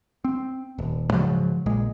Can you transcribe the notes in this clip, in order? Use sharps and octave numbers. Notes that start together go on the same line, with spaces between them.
C4
D#1
G#2 C#3 F3 F#3
A#1 A#2 G#3